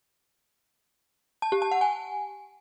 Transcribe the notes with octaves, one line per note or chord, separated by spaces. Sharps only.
A5
G4
A5
F#5
G#5